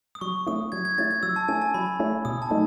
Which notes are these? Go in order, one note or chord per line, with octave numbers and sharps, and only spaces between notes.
D#6
F#3 C#6
A3 C#4 E4 D#6
F#3 G#6
G#6
A3 C#4 E4 A6
G#6
F#3 E6
A5
A3 C#4 E4 G#5
A5
F#3 B5
A3 C#4 E4
B2 D#6
A5
F#3 A3 D#4